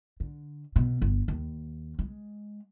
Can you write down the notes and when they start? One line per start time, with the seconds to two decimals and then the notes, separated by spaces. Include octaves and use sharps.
0.20 D3
0.76 B2
1.02 G1
1.28 D#2
1.99 G#3